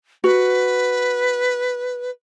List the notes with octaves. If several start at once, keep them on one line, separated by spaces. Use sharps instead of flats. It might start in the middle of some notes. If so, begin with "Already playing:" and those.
F#4 B4